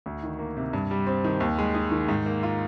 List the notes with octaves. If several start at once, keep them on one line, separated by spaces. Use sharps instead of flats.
D2
D#3
A#3
C3
G2
G3
C4
D#3
D#2
G#3
D#4
D#3
G#2
A#3
F4